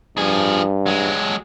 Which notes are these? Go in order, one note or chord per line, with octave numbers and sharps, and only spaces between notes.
G2 F3 G#4
F#3 G#3